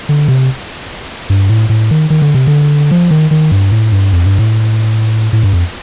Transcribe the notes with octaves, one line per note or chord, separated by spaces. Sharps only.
D3
C3
G2
A2
A2
D#3
D#3
D3
C3
D3
F3
D#3
D#3
G2
A2
G2
F2
G2
A2
A2
G2
F2